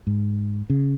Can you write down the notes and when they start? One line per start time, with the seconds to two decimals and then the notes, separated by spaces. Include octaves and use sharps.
0.07 G#2
0.70 C#3